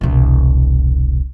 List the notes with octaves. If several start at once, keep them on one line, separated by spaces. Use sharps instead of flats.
E1 C2